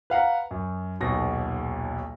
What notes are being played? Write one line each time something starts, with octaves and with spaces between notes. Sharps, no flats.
B4 F5 F#5 A#5
F#2
D#1 B1 B2 A#6